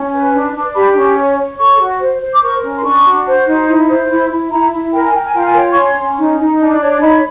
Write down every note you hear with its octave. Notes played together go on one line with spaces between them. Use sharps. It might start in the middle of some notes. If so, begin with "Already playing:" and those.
Already playing: C#4
B4
D4
D4
G4 B5
C#4
C#5
C#5
A4 C#6
F#4
C5
C5
D6
A#4 C#6
C#4
C6
D4 C#6
F#4
C5
D#4
E4
C5
E4
E4
E4 A#5
E4
A#4 G5
G#5
A#4 G5
G#5
F4 G5
G#5
C#5 G5
C#6
C#4 C6
C#4
D#4
D#4
D4
C#5
D#4 B5